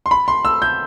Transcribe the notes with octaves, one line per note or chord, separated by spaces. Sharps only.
C6
B5
C6
E6
G6